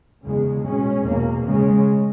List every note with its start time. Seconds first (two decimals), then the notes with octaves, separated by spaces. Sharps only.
0.25 E2 C#3 G#3
0.66 B2 G#3 C#4
1.05 E2 B2 A#3
1.46 C#3 G#3 C#4